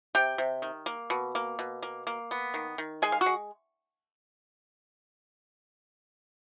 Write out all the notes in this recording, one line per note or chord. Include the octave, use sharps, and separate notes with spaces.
C3 G4 G5
C3
D#3
A#3
B2
A#3
B2
A#3
A#3
B3
D#3
D#3
G#3 G#4 G#5
F5
F#4 F#5
G#3